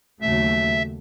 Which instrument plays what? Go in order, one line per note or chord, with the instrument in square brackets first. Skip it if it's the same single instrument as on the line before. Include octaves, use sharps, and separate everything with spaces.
[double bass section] D#2 C#3 F#3 A3 [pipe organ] E5